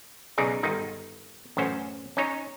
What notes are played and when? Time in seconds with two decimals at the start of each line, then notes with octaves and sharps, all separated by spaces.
0.38 B1 C#3 D#4 G#4 D5
0.63 G1 D#3 D#4
1.57 A1 F#2 C#4 C5
2.17 C#4 D#4 C#5